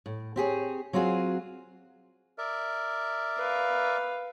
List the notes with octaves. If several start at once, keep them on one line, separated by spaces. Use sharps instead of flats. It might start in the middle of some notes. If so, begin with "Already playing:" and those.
A2
C4 G4 G#4 C#5
F#3 C4 F4 F#4 G#4
A#4 D5 E5
B4 F5